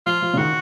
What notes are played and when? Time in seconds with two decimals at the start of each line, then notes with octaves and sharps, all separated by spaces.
0.06 F3 F4
0.22 F3
0.33 C#3
0.38 D#3 F#4